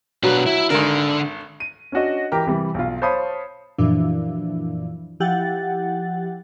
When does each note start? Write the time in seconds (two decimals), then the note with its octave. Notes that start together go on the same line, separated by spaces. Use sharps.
0.23 B2 F#3 D4 B4
0.46 E4
0.70 G#1 D3 D4 A#4
1.60 D#7
1.92 C#4 D4 F#4 D#5
2.32 E3 G4 A#4 A#5
2.46 C3 E3 G3
2.74 B1 F4
3.02 C5 C#5 F5 A5 B5 D#6
3.78 F#2 A#2 E3 F3 D4 E4
5.20 F3 E4 G4 F#5 G5 A6